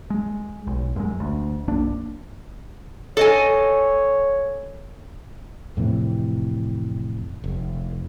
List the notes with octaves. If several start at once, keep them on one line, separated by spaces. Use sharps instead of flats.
G#3
B1
F#2 G#3
D2
A#1 F#2 A#3 D4
A4 C#5 D#5 G#5
F2 A2 C3 E3
F1